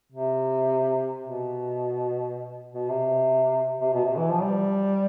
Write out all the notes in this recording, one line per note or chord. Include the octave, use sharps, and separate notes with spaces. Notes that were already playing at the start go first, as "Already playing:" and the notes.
C3
B2
B2
C3
C3
B2
C3
E3
F3
G3